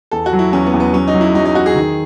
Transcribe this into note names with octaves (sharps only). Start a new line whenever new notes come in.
E2 A4
F#4
F#3
E4
E2 C#4
B3
E2
B3
F#3 C#4
D#4
F#3
E4
F#3 D#4
D#4
E2 F#4
G#4
D#3